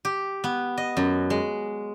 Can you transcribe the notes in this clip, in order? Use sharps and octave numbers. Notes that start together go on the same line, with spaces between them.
G4
B3
D#5
F#2
G#3